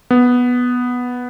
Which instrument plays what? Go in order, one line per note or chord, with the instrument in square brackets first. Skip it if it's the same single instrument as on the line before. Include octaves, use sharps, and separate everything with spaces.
[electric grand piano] B3